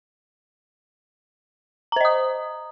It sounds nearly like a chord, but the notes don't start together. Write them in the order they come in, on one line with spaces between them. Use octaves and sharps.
A#5 C5 D#5 D#6